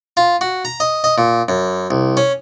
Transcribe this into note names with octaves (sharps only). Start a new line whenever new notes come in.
F4
F#4
A#5
D#5
D#5
A#2
F#2
C2
C#4